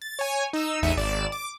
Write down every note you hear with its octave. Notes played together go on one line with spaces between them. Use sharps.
A6
C#5 G#5
D#4 E6
A1 E2 D#4 E5 C#7 D#7
G#1 D5 E7
D6